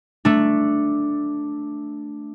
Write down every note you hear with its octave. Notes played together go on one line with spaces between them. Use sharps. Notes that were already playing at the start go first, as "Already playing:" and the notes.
A3 D4